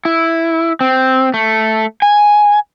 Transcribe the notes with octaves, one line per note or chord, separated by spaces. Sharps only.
E4
C4
A3
G#5